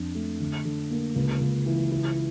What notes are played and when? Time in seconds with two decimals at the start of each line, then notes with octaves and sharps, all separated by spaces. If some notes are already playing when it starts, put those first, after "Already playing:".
Already playing: F2 D4
0.15 A3
0.40 D3
0.65 D3
0.91 A#3
1.16 C#2
1.41 C#2
1.66 E3
1.91 E4